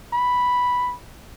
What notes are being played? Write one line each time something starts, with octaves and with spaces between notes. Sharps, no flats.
B5